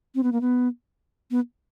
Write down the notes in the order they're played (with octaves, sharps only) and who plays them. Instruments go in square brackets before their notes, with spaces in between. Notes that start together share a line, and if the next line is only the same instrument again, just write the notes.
[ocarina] C4
B3
A#3
B3
B3